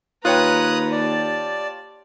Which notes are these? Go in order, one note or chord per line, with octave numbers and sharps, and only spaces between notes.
D#2 F4 B4 C#5 G5 A#5 D#6 F#6
G4 D5 A5